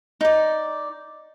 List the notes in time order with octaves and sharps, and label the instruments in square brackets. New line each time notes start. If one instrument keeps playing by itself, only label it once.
[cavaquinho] D#4 D5